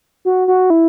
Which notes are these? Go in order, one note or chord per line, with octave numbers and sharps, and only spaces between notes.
F#4
F#4
E4